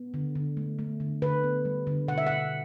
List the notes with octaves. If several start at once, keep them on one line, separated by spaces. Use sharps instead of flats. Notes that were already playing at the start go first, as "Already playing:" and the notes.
Already playing: B3
D3
D3
A3
A3
D3
D3 B4
B3
G3
D3
B2 F#5
E5
B2 F#5